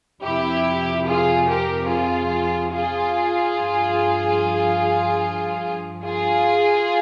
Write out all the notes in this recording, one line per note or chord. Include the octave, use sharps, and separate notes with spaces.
F2 C3 F3 E4 G4
F4 G#4
G4 A#4
F4 G#4
F4 G#4
G2 F3
F4 G#4